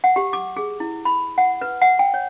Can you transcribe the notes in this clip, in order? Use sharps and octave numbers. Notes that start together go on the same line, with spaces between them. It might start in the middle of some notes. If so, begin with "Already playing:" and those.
F#5
G4
D6
G#4
E4
B5
F#5
B4
F#5
G5
C#5